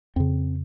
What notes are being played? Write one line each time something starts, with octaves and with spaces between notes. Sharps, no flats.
F2 C#3 C4